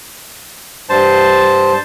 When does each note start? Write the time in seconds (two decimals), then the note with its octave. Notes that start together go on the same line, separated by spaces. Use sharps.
0.89 G2 C5 A5